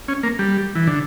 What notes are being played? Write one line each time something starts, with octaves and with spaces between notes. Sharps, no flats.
C#4
A#3
G3
E3
D3